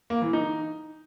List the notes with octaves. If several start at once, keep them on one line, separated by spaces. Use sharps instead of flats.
A#3
E3
D#4